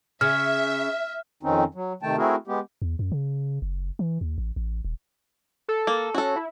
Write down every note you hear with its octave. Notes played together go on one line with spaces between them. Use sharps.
C#3 E5 F6
F2 D#3 C4 C#4 D#4
F#3
C3 D#3 A3 G5 A5
A3 C4 E4 F#4 G#4 A#4
G#3 B3 G4
E2
F#2
C#3
F#1
E3
D#2
A1
A1
D#1
A4
A#3
C#4 F#4 A4
E4